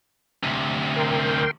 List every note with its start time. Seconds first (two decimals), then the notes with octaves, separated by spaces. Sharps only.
0.43 D2 C3
0.96 A#4 G5 C6